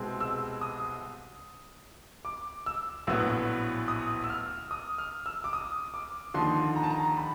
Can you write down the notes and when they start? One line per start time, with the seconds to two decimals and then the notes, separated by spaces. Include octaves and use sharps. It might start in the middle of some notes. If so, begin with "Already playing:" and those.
Already playing: C2 B2 G#3 C4
0.20 E6
0.61 D#6
2.25 D6
2.66 E6
3.07 A#1 A2 F#3 B3 E6
3.88 D#6
4.24 E6
4.30 F6
4.71 D#6
4.98 F6
5.26 E6
5.44 D6
5.53 D#6
5.94 D6
6.34 D#2 D3 F3 C6
6.76 A#5
6.83 A5
6.90 A#5
7.17 B5